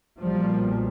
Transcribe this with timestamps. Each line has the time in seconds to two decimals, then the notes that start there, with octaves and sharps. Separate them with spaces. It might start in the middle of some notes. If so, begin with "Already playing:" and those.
0.23 B1 A#2 F3 G3